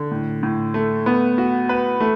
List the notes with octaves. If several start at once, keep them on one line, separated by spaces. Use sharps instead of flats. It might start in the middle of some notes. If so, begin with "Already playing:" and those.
Already playing: D3
A2
A2
A3
B3
F#4
B4
A3